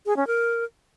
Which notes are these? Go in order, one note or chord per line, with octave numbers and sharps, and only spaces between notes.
G#4
C#4
A#4